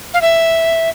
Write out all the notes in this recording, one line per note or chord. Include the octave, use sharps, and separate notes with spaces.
F5
E5